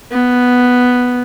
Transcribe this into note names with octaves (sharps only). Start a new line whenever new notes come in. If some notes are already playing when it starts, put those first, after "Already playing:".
B3